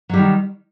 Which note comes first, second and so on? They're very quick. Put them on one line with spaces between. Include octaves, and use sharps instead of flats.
F#3 G3 D#3